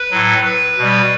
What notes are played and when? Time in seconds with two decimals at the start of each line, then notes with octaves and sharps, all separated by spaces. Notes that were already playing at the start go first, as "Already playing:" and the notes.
Already playing: B4
0.11 A2 F#3
0.45 B4
0.78 B2 G3